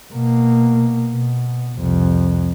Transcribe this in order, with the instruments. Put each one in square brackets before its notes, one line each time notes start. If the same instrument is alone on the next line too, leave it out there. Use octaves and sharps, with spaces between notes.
[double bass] B2 A#3
B2
C2 F2